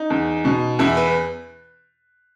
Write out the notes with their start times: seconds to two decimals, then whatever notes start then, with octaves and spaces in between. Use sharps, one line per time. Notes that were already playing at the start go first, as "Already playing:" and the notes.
Already playing: D#4
0.10 E2
0.45 B2
0.79 E2 E4
0.97 B4